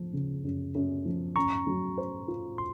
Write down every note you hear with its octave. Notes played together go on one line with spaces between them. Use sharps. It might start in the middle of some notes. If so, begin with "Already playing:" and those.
Already playing: F3
C#3
F#2
F#2
F3
C#4 A#5 C#6
F#3
C5
F4
C6